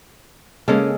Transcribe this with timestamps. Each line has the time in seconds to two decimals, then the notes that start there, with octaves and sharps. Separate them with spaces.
0.68 C#3 G#3 A#3 C#4 A4